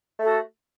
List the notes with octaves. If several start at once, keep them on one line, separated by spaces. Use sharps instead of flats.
A3 F#4 A4